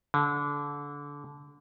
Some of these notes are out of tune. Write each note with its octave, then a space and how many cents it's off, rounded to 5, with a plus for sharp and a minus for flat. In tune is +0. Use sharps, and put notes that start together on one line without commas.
D3 -25